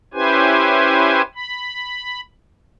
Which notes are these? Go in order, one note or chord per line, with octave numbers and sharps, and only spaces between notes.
C#4 E4 G4 B4 C5 G#5
B5